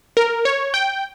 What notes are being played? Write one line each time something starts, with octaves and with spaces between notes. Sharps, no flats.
A#4
C#5
G5